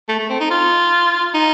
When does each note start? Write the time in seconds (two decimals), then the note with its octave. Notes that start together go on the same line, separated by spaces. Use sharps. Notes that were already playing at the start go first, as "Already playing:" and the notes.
0.09 A3
0.19 A3
0.30 C4
0.40 D#4
0.51 F4
1.35 D#4